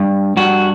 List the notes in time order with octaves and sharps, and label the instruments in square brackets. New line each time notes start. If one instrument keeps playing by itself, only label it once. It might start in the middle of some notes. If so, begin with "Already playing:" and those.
Already playing: [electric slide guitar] G2
G2 F#4